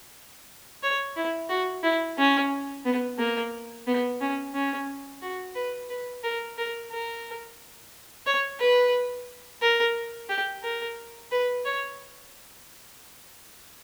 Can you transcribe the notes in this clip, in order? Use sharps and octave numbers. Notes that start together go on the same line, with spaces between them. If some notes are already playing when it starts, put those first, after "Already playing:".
C#5
E4
F#4
E4
C#4
B3
A#3
B3
C#4
C#4
F#4
B4
B4
A#4
A#4
A#4
C#5
B4
A#4
G4
A#4
B4
C#5